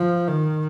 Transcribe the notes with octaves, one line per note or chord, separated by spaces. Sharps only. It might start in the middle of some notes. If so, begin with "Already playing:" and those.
Already playing: F3
D#3